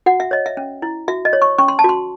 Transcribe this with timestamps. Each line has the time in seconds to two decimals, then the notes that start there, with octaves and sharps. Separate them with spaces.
0.06 F#4 F#5
0.20 E5
0.31 C#5 D#5
0.46 E5
0.57 C#4
0.82 E4
1.08 F#4 E5
1.25 D#5
1.33 C#5
1.42 C#6
1.58 C#4 C#6
1.68 C6
1.79 A5
1.84 F#4 C6